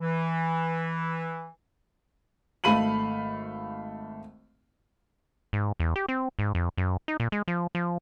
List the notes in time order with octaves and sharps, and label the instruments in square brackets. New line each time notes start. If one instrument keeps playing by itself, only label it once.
[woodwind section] E3
[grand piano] G#1 A3 F5 B5 D#7 F#7
[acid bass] G#2
E2
G4
C4
G#2
F2
F#2
D#4
A#2
G#3
F3
F3